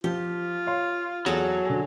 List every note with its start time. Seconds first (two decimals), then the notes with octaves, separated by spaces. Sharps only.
0.04 F3 F4 G4
0.67 C#5 F5 C6
1.26 E2 F#3 G#4 A4
1.66 D3 G#5